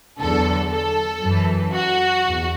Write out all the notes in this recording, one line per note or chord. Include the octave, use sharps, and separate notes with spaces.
E2 D3 F#3 A4
A4
F#2 E3
F#4
E2